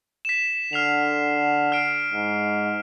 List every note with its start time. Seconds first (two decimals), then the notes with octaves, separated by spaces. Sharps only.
0.25 B6 E7
0.73 D3 F6 C7 F7
1.72 F6 C7 D7
2.13 G#2